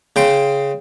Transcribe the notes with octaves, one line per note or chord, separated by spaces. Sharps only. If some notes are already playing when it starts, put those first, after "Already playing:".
C#3 G5 C6